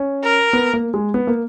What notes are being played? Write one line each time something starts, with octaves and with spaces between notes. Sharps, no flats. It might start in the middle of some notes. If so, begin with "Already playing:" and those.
Already playing: C#4
A#4
B3
A#3
G#3
B3
A#3